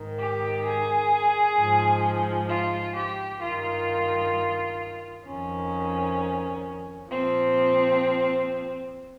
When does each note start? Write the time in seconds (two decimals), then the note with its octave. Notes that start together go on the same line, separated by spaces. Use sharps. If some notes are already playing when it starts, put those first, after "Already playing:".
Already playing: G#2 D#3
0.19 G4
0.66 G#4
1.58 G#2 F3
2.49 F4
2.96 G4
3.42 G2 D#3 F4
5.26 F2 D#3 C#4
7.10 A#2 F3 C4